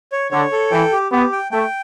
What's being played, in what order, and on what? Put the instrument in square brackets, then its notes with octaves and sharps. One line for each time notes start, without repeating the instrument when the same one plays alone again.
[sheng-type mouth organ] C#5
[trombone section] D3 [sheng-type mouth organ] C#5
[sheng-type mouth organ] A4
[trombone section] E3 [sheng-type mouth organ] G5
[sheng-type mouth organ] G4
[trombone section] B3 [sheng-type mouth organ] G4
[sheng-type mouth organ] G5
[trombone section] A3 [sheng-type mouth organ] G5